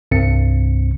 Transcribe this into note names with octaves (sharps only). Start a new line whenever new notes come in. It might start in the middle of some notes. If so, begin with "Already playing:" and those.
C2 G2 C3 C4 C#7